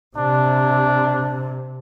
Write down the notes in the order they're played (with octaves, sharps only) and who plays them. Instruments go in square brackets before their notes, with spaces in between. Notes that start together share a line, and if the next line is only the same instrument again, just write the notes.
[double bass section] C3 [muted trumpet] D4